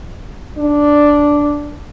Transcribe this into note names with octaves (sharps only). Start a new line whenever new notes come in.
D4